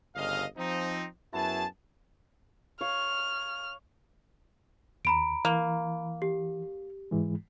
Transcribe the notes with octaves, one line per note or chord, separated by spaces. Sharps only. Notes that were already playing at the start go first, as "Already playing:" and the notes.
G1 C#2 D#5 F5
F3 C4 D#4
F#2 B3 E4 F#4 G#4 A5
C#5 F5 F6
D#2 A#5 B5 D7
E3 A#3
G4
G#2 E3 G#3